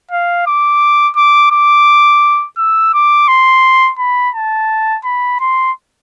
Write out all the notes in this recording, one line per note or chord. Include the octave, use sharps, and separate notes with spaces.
F5
D6
D6
D6
E6
D6
C6
B5
A5
B5
C6